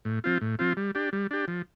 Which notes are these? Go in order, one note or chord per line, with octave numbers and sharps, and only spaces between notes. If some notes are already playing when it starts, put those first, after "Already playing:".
A2
F3 C4 F4
A2
F3 C4 F4
G3
D4 G4
G3
D4 G4
F3